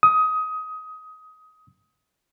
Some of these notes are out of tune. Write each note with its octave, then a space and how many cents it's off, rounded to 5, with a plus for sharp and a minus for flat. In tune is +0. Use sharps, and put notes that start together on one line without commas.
D#6 +20